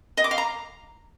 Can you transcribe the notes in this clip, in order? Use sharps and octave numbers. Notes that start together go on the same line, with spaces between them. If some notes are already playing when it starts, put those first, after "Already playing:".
D#5
D6
F5
A#5